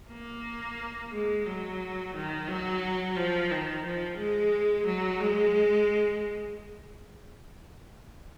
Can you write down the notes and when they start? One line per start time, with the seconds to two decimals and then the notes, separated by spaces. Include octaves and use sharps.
0.11 A#3
1.12 G#3
1.47 F#3
2.15 D#3
2.49 F#3
3.17 F3
3.51 D#3
3.85 F3
4.18 G#3
4.86 F#3
5.20 G#3